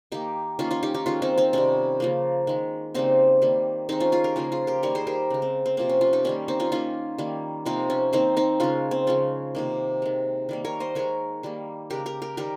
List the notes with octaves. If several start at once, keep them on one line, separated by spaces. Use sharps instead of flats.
D#3 A#3 D#4 G4
D#3 A#3 C#4 F4
C#4 F4
D#4 G4
D#4 G4
D#3 G#3 C#4 F4
C4 D#4
C4 D#4
C3 D#3 G3 C#4
C#3 F3 A#3
D#3 G#3
C#3 G3 A#3 C4 D#4
D#3 G3 A#3
D#3 G#3 C4 D#4
C#4 F4
F4 G#4
G4 A#4
C#3 F3 A#3 F4 G#4
F4 G#4
G4 A#4
D#3 G3 A#3 A#4 C#5
G#4 C5
G4 A#4
C#3 G#3
C4
C4
C3 F3 A#3 C4
C#4
C#4 F4
D#4 G4
D#3 G3 A#3 C#4
C4 D#4
C#4 F4
D#3 A#3 C#4 F4
D#3 G3 A#3
C3 F3 A#3 C4 D#4
C#4
D#3 A#3 C4 D#4
C4 D#4
C#3 G#3 C#4 F4
C4
C#3 F3 G#3 C#4
C3 D#3 A#3
D#3 G#3
D#3 G3 A#3
A#4 C#5
C5 D#5
D#3 G#3 A#4 C#5
D#3 G3 A#3
C#3 G#3 G4 A#4
G4 A#4
G4 A#4
D#3 G3 G4 A#4